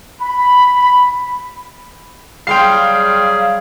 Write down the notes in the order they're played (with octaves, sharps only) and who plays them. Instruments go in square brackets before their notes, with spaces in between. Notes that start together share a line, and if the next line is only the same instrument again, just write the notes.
[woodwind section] B5
[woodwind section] F#3 G3 G#4 [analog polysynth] F5 [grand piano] G5 C6 C7